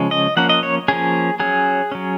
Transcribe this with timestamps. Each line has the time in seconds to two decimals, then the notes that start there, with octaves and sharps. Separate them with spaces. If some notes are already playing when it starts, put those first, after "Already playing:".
Already playing: C#3 F3 G#3 C#4
0.11 D#5
0.37 F3 A#3 C#4 F#5
0.49 D#5
0.63 C#5
0.88 F3 A#3 C#4 G#4
1.40 F#3 C#4 G#4
1.92 F#3 C#4